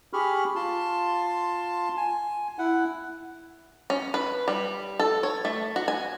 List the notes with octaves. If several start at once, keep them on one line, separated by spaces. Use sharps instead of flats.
G4 G#4 B5 C#6 F6
F4 A5 C6
G#5
E4 F#5
C#4
B4
G3
A4
C#5
A3
F#4
G#5